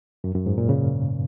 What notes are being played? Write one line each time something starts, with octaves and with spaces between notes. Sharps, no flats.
F#2
F#2
G#2
A#2
C#3